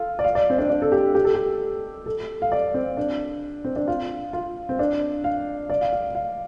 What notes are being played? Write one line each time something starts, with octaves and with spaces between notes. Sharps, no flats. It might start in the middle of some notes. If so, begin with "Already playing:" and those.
Already playing: F4 A4
D5
F5
D5
C4
D4
D4
A4
G4
G4
A4
G4
A4
F5
D5
C4
D4
C4
D4
F4
F4
C4
D4
F5
D5
F5
F5
F5